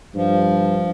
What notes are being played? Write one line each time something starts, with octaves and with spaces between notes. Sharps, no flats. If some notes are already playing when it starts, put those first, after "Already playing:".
G2 F3